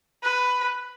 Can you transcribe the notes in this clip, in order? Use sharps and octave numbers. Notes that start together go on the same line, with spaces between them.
B4